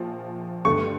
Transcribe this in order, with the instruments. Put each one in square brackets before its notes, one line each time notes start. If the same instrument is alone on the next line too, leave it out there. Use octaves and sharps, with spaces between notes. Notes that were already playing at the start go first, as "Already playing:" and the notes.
Already playing: [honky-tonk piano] A#1 A#2 F3
[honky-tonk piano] G2 D3 A3 [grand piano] C#6